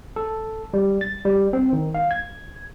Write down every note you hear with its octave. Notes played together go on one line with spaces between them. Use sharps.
A4
G3
A6
G3
C4
D#3
F5
G#6